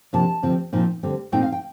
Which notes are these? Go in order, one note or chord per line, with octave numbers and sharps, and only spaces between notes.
C3 F3 A#3 D4 A5
D2 C3 F3 C4
A#2 F3 C4 D#4
D2 D3 G3 C4
A#2 A3 C4 D#4 G5
F5
G5